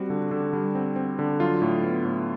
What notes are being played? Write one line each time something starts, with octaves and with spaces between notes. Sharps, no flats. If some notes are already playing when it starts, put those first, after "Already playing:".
Already playing: G3 C4 F#4
D3
D3
G3
C4
C4
D3
F#3 F4
A2
B3
A2